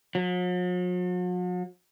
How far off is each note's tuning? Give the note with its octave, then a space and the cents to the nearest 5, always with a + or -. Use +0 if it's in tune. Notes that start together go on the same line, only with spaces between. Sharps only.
F#3 -45